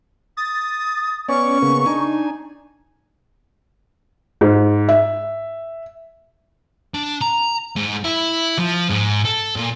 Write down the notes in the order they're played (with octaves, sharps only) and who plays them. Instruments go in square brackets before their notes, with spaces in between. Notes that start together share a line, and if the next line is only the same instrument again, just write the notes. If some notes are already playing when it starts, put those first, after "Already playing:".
[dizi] D#6 [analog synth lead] A6
[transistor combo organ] B3 C#5 D5 [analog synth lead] C#4 [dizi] C#6
[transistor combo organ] C#3 A#3 B3
[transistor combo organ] D4 G#5 [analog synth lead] D#4
[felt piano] G#2
E5
[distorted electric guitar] D4
A#5
G#2
E4
F3
G#2
A4
A#2